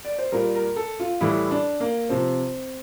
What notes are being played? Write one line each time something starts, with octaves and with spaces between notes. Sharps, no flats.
D5
C5
A#2 G3 A#4
A#4
A4
F4
A2 E3 G3 E4
D4
A#3
C3 F3 C4